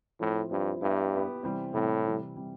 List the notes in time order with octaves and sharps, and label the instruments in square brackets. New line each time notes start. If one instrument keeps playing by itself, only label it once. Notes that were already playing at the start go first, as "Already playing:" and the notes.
[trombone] A2 [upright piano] F3 C4 E4
[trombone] G2 [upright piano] F3 C4 E4
[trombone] G2 [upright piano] B3 E4 G4 B4 E5
[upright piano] B3 E4 G4 B4 E5
C3 E3 G3 C4
[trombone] A2 [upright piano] C3 E3 G3 C4
[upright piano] C3 E3 G3
C3 E3 G3